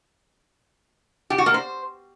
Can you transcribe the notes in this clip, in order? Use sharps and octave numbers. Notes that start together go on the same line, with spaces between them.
G4
F#4
A#3
C5